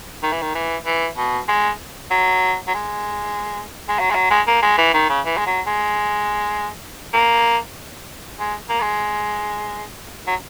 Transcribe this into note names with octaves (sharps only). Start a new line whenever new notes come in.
D#3
E3
D#3
E3
E3
B2
G#3
F#3
F#3
G#3
G#3
F#3
G#3
F#3
G#3
A#3
G#3
E3
D#3
C#3
E3
G#3
F#3
G#3
A#3
G#3
A#3
G#3
F#3